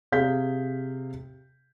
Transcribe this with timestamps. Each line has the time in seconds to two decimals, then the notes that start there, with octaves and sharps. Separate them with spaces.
0.12 C3 G#4 F5 G6 B6